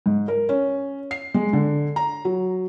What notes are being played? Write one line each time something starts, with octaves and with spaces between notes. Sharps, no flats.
G#2
A#4
C#4
C7
G#3
D3
A#5
F#3